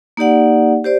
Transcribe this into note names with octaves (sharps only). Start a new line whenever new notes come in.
A#3 D#4 G4 D5 F#5
G4 C5 D5